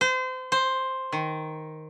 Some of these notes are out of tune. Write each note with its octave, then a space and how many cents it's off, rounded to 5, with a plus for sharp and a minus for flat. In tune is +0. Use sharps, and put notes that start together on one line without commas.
C5 -30
C5 +5
D#3 +5